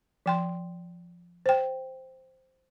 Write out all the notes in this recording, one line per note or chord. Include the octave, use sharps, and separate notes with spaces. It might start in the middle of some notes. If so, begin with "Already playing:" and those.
F3 G5 C6
C5 G5